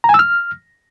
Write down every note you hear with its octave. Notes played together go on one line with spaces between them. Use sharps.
A#5
G#5
E6
F6